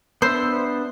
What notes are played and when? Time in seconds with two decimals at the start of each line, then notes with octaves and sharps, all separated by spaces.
0.22 B3 D4 C5 E5 E6